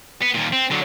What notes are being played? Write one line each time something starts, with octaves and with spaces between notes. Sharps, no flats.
B3
D#2 A#2
C4
D3 F#3